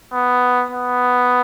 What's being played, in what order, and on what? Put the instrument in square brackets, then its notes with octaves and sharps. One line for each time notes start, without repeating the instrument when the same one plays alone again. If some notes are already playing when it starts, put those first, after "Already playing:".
[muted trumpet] B3
B3